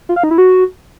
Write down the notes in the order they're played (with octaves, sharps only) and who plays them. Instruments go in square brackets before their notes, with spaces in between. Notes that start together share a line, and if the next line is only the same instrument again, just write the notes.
[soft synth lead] F4
F5
D#4
E4
F#4